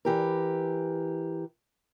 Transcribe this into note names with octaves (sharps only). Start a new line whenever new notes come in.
E3 G4 A#4